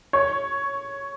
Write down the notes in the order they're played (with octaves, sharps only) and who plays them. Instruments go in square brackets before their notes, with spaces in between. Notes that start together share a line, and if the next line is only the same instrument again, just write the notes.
[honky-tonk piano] C#5